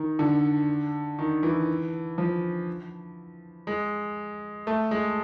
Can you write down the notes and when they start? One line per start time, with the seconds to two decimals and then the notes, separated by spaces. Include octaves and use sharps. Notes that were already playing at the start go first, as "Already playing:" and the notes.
Already playing: D#3
0.19 D3
1.19 D#3
1.43 E3
2.18 F3
3.67 G#3
4.67 A3
4.91 G#3